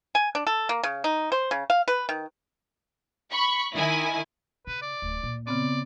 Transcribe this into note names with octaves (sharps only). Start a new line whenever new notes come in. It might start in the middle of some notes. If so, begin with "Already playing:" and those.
G#5
D4
A4
A#3
C#3
D#4
C5
C#3
F5
B4
D#3
B5 C#6
D#3 E4 G#5
C#3 B4
D5
D1
A#2
C#3 B3 C4 D5